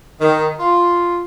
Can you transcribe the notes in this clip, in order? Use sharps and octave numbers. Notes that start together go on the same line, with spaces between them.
D#3
F4